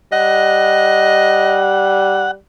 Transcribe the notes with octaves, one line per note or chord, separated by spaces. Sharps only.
G3 D#5 F#5